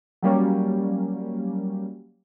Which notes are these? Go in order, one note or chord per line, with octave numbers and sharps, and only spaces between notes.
F#3 G3 A#3 C#4